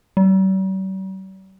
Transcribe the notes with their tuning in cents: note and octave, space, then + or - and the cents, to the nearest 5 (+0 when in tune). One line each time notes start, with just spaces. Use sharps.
G3 -45